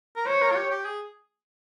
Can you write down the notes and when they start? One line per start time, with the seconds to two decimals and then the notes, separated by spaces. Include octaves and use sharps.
0.16 A#4
0.26 C5 C#5
0.42 A#4
0.51 F4
0.56 G4
0.70 G4
0.85 G#4